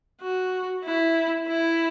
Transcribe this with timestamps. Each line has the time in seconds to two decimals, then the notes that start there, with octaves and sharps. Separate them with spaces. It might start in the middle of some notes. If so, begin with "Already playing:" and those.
0.21 F#4
0.84 E4
1.48 E4